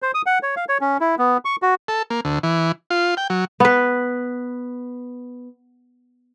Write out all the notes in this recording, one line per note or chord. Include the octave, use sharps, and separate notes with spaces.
C5
D#6
F#5
C#5
F5
C#5
C#4
E4
B3
C#6
F#4
A4
A#3
D2
E3
F4
G5
F#3
B3 B4